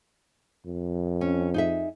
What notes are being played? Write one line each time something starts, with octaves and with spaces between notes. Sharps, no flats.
F2
C#4
D#4 G#4 E5